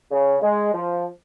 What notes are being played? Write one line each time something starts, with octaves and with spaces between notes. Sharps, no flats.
C#3
G#3
F3